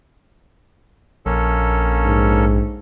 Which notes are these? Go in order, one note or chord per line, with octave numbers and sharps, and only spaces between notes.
A#1 A#3 C#4 A4
G#2